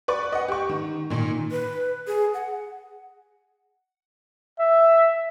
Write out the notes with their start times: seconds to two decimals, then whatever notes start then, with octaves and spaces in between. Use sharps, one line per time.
0.08 B4 D5 C#6
0.32 D#5 F#5
0.48 G4 C#6
0.69 D#3
1.10 A#2 D#3
1.51 B4
2.07 G#4
2.34 F#5
4.59 E5